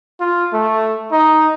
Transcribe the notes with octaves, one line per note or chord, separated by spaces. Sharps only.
F4
A3
D#4